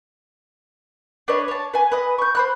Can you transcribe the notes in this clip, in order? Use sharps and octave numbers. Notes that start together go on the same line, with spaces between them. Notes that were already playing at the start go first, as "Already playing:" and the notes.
D4 B4 C#5 D#5
C#5 A5
B4 G#5
B4 D#5
C#6 G6
C5 B5 F#6